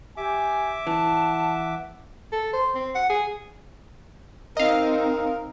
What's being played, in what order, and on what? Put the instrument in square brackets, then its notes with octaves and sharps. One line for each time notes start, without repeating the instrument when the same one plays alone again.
[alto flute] G4 [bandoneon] E5 D6 [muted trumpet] G#5
[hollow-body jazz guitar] E3 [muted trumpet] F#5 [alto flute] A5
[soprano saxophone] A4
C5
C4
F#5
G#4
[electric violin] C4 D#4 [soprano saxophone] A#4 [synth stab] D#5 F5